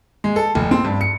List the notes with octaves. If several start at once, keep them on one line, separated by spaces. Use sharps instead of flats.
G#3
A4
F1
C4
G2
C#7